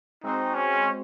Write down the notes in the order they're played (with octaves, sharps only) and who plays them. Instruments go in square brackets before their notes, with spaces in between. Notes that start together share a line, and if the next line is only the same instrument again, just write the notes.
[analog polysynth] G#3 C4 F#4 C5 [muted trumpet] D#4
[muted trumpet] C#4